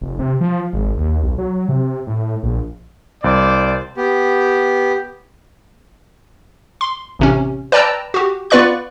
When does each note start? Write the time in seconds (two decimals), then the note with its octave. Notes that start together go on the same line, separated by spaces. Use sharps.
0.01 F1
0.19 C3
0.41 F3
0.73 G#1
0.97 D#2
1.23 B1
1.38 F#3
1.69 C3
2.07 A2
2.43 A#1
3.24 C2 C5 D5
3.97 B3 G4
6.81 C6
7.19 A1 C3 C#4
7.72 B4 D5 G5 A5 A#5 E6
8.14 F#4 G4
8.50 B3 F4 B4 D5 C#6 F#6